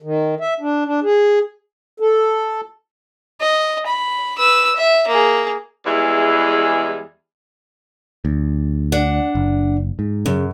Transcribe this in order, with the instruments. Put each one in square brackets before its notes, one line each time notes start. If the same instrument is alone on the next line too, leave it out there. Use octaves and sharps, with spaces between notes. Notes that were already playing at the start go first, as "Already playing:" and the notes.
[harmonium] D#3
E5
D4
D4
G#4
A4
[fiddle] D#5
B5
B4 E6
E5
A#3 G#4
[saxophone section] E2 E3 G3 G#3 G#4 E5
[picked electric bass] D2
[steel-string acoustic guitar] D4 F#5
[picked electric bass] F#1
G#2
[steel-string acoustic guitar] F#2 [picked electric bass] C#3